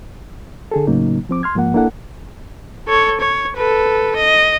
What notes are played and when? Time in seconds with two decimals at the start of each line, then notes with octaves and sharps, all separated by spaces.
0.71 D3 G#4 A4
0.87 A2 C#3 F#3 A#3 D#4
1.29 F3 C4 D6
1.43 C6 F6 G#6
1.55 G#2 F3 A#3 F#5
1.74 A#3 D4 E4 A4 F#5
2.88 A4 C#5
3.21 C#5
3.57 A4 B4
4.16 D#5